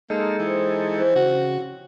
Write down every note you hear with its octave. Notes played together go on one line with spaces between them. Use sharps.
G#3 A#3 D#4 A4
E3 G4 C5
F3 C4 C#5
C#3 F#4